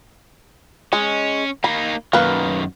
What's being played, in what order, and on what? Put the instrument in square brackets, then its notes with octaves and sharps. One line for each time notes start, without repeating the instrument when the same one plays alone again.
[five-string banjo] G#3 [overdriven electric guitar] C#4
[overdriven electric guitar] A#3 D#4 [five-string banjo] B5
[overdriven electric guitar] F#2 D#3 [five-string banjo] A#3 B4